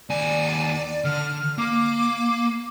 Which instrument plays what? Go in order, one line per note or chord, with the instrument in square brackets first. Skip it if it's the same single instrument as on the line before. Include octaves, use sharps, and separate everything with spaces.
[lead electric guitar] D#2 G#5 [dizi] D5
[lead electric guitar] D3 [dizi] F6
[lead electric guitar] A#3 [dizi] D6